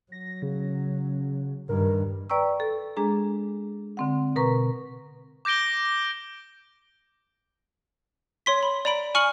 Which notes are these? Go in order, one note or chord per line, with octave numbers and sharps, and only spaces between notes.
F#3 A#6
C#3
G2 D#3 A#4
B4 D5 G5 A#5 C#6 E6
A4
G#3 D4 G#4 A#5
D3 C4 F#5
B2 A#4 B4 A#5 C#6
D6 G6 A#6 D7 G7
C#5 C6 B6
B5
D5 A#5 B5 D7 F#7
G#5 C#6 F6 C#7 F#7